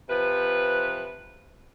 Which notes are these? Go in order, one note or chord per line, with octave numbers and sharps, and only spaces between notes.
C3 F3 B4